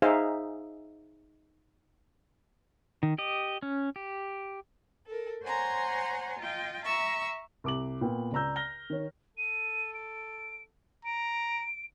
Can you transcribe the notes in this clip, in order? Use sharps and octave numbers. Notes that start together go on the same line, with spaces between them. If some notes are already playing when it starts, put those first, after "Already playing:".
D#4 G#4 C5 E5 F5
D#3
G4 D#5
C#4
G4
A4 A#4
C5 C#5 F#5 G#5 A#5 C6
F4 D#5 G5
E5 A#5 C#6 E6
C2 D6 F#7
A#2 B3 G5
C#2 D5 A#5 E6 G6
F6 A#6 G7
D#3 C#5
A4 D#7
D7
A#5 D7